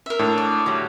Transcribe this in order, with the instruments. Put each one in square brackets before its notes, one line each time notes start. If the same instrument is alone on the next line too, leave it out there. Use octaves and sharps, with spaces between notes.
[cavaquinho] A#4 E5
[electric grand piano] A2 [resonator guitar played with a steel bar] D4
[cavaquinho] D5
[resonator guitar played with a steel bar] F#3 G3